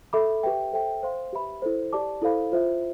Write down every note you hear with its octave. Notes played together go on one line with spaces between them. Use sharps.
A4 E5 B5 D6
G4 B4 E5 G5
A4 C5 E5 G5
C5 F5 C6
G4 B4 E5 B5
E4 A4 C5
G4 D5 A5 D6
E4 A4 C5 F5 B5
F4 C5 E5